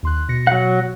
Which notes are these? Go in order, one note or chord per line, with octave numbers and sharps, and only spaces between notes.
D#2 C6 F#6
B2 A#6 C#7
F#3 F#5